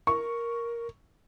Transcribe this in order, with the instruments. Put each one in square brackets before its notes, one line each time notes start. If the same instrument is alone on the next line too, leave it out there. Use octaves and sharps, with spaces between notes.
[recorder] A#4 [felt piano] C#6